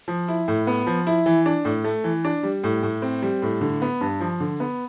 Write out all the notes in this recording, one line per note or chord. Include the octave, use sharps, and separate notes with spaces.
F3
E4
A2
B3
F3
E4
E3
D4
A2
A3
E3
D4
G3
A2
A2
C4
G3
A2
D3
B3
G2
F3
D3
B3